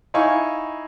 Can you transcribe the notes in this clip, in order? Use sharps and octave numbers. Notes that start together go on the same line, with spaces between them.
D#4 E4 F5 G#5 C#6